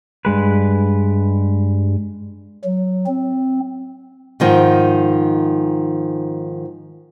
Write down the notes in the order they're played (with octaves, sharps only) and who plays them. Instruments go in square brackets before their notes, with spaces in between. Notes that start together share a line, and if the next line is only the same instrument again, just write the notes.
[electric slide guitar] G2 G#3 B4
[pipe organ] F#3
C4
[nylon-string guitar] G#2 D#3 F3